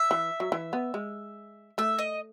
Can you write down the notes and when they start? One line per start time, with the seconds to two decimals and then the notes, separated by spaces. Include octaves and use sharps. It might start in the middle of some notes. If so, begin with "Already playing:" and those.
Already playing: E5
0.11 E3
0.40 F#3
0.52 E3
0.73 B3
0.94 G#3
1.78 A3 E5
1.99 D#5